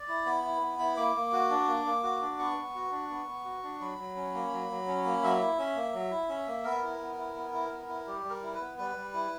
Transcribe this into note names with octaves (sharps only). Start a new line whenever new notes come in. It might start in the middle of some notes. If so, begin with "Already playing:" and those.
Already playing: D5
E4
B3 B5
E4
B3
E4
A#3 D6
A#3
F#4
D4
A#3
A#3
F#4
D4
B3 C#6
B3
F#4
D4
B3
B3
F#4
D4
F#3 B5
F#3
C#4
A#3
F#3
F#3
C#4
A#3
F#3 E5
E4
C#4
A#3
F#3
E4
C#4
A#3
B3 A#4
E4
B3
E4
B3
E4
B3
E4
G3 G4
G3
A#4
E4
B4
B3
G3 B4
G3
E4